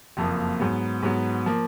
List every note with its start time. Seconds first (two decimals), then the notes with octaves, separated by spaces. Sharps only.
0.17 F#1 F2 F3 A#3
0.60 G#2 F#3 B3
1.02 G#2 F#3 B3
1.46 F3 A#3